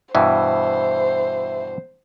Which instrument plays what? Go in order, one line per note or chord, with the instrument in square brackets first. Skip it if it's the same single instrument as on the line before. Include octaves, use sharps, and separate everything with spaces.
[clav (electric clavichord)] G2 B2 E3 [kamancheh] C5 [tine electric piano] E5